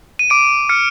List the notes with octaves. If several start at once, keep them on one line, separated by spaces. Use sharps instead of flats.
D#7
D6 D7
F6 C#7